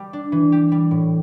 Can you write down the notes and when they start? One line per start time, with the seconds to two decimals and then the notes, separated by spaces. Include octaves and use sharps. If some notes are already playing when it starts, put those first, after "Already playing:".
Already playing: G3 G4
0.13 D4
0.32 E3
0.52 G4
0.72 G3
0.91 A2